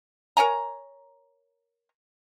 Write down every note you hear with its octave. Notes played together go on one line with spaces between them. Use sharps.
A#4 C#5 G#5 A#5